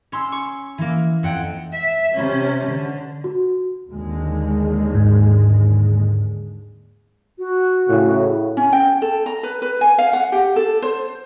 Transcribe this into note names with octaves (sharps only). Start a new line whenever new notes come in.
C#4 C6 E6
C#6
E3 A#3
F2 F#5 G5
E5
C3 C#4
D3
F#4
D#2 D3 G#3
G#2
F#4
A2 C#3
C#4
G5
A4
A#5
B4
B4
G#5
F5
F#5
G4
A4
C5